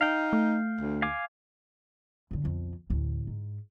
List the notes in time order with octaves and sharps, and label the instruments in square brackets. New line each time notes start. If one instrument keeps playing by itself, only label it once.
[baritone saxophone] D#4 [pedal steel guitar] F5 G5
[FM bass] A3
[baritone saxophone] D2
[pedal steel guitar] F5 G#5 D6
[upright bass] F#2 D3
B1 F2
A1 D2
G#2